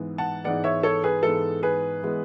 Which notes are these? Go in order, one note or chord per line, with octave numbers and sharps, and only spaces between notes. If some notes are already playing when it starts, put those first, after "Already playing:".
Already playing: G#2 E3 G#3 B3
F#5 A5
G#2 E3 G#3 B3 D5 F#5
C#5 E5
A4 C#5
G#4 B4
G#2 E3 G#3 B3 A4
G#4 B4
E3 G#3 B3